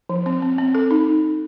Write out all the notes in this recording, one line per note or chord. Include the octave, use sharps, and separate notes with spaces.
F3
C4
C4
C4
A4
D#4